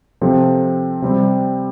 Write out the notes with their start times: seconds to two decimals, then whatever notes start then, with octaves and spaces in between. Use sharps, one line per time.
0.21 C3 F3 C4 A4
1.02 C3 G3 C4